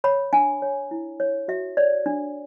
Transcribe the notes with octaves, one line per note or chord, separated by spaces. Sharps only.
C#5 B5
D4 G#5
C#5
E4
C#5
F#4 E5
C#5 D5
D4